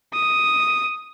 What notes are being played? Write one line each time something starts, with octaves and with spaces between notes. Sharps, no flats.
D#6